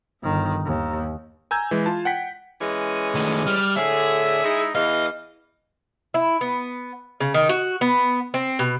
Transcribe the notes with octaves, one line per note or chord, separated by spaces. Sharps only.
G1 D#3
D#2
G#5 A#5 E6 G6 G#6
E3 G#3
F4 A5
F#5 G5 B6
E3 G#3 C#4
D#3 A3
G3 F6
A2 D3 G#4 E5
G#3 D#4 E4
E2 E3 D#5 F5
E4
B3
C#3
D#3
F#4
B3
C4
B2